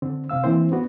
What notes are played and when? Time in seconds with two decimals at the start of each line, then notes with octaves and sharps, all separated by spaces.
0.02 D3 C4
0.29 C3 C4 F5 E6
0.44 E3 A#3 C4 E4 C5
0.72 B3 D4 F#4